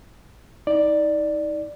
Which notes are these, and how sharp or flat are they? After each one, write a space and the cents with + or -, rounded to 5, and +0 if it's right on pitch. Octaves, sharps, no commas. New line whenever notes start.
D#4 +30 D5 +5